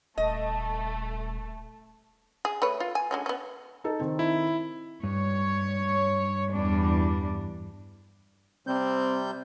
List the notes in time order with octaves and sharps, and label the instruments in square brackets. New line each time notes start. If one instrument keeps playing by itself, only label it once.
[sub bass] D#1 [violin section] A3 [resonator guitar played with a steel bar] D#5
[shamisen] G#4
A3 B4 C#5
F4
G#5
D3 G#3 C#4
B3 C#4
[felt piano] D#4 A4
D#3 C4
[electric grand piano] E4
[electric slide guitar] G2 [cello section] C#5
[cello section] E2 G3 D4
[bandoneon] C3 G3 G6 [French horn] C4